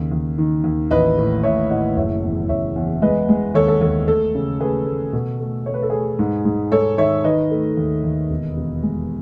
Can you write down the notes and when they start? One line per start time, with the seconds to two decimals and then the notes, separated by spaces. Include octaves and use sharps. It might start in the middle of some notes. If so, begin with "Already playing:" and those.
Already playing: D#2 C#3
0.12 D#2
0.38 D#3
0.64 D#2
0.91 A1 B4 D#5
1.18 A2
1.43 A2 C#5 E5
1.70 A2 D#5 F#5
1.97 F#1 C#5 E5
2.23 E2
2.49 F#1 C#5 E5
2.76 E2
3.02 G#3 B4 D#5
3.29 G#3
3.54 D#2 A4 C#5
3.68 A4
3.81 D#2 A4
4.08 A3 A4
4.35 C#3
4.60 A3 G#4 B4
4.87 A3
5.13 B2 A4
5.40 A3
5.66 A3 C#5
5.74 B4
5.82 A4
5.90 A3 G#4 B4
6.19 G#2
6.45 G#2
6.72 G#2 A4 C#5
6.98 D#3 C#5 E5
7.24 D#3 B4 D#5
7.51 A3
7.77 D#2
8.03 D#2
8.30 E1
8.57 E1
8.83 G#3